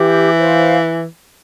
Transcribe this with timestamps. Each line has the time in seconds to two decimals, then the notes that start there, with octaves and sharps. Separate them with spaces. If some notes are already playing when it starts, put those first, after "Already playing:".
Already playing: E3 G4
0.39 C5 F5